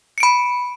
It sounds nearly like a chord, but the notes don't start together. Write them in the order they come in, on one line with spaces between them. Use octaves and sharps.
C#7 D7 B5